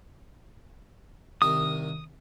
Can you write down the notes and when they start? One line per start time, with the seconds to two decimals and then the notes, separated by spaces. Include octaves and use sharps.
1.42 C2 D#3 A#4 D#6